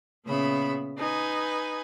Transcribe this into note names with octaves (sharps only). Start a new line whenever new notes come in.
A#2 C#3 B3 E5 B5
D#4 B4 G#5